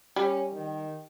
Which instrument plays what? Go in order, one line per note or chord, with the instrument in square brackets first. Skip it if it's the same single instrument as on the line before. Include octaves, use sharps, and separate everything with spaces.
[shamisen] G3 [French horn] C#4
[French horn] D#3